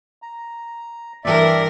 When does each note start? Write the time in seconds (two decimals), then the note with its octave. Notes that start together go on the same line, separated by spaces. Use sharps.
0.22 A#5
1.24 G2 E3 A#4 D5 E5